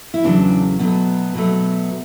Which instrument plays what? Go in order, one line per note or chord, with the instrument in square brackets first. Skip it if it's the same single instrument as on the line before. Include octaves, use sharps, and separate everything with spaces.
[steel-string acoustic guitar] E4
E2 C#3 F#3 A3 D4
B2 F#3 A3 B3
B2 F#3 A3